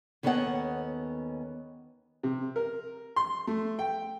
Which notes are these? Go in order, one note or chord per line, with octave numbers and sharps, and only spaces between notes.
D#2 B3 C#4 A4 D#5 F#5
C3
A#4
C6
A3
G5